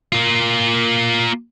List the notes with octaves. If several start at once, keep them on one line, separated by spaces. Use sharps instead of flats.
A#3 F4